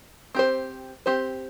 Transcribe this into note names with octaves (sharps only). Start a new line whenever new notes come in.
C4 G4 C5
C4 G4 C5